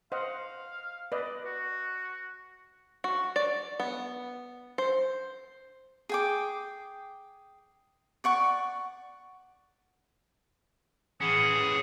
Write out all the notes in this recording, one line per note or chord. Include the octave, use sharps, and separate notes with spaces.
C5 D#5 F5 F#5
B4 D5 D#5
F#4
F#4
D5
B3
C5
G#4 G5 D6
D5 F#5 C#6
E3 C#4 G#4 F#5